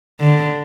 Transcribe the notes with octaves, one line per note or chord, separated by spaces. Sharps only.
D3